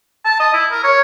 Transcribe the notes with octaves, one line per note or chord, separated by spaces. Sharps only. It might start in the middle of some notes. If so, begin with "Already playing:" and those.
A5
D#5
E4
A#4
C#5